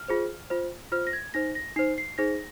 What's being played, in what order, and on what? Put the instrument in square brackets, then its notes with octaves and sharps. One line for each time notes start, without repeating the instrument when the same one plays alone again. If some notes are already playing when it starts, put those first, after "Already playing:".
Already playing: [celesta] F6
F4 G#4 C5
F4 C5
F4 C5 F6
A#6
G#6
D#4 C5 A#6
A#6
D#4 C5 C7
C7
D#4 G#4 C5 A#6